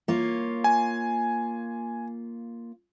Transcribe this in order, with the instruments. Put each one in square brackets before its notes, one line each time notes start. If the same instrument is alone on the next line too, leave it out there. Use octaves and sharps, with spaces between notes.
[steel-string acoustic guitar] A#3 F4 C#5
[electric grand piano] G#5